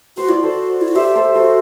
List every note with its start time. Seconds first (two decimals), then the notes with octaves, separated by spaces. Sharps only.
0.17 F#4 C5
0.29 E4 D5
0.39 F#4 A4 C5
0.81 E4
0.88 F#4
0.95 G4 C5 E5
1.15 A4 C5
1.35 F#4 A4 C5